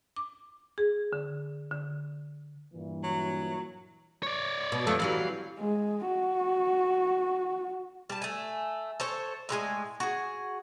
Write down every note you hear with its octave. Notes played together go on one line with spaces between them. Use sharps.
D6
G#4
D3
D3
G2 A#2 E3
F#3
C#5 D5
B2
F2 E3 A3
E3 F#3 G3 F5
G#3
F#4
G3 A5
A3 G#5
A4 C5 C#5
A2 G#3 G4 G#5
F#4 G#4